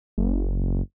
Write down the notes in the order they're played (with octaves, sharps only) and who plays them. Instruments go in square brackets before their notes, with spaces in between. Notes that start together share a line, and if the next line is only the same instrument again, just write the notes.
[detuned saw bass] F#1